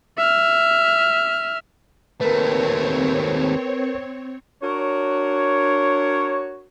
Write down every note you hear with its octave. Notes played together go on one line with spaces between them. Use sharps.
E5 F6
D#2 A3 C4 A#4 B4 C#5
D4 F#4 A#4 C#5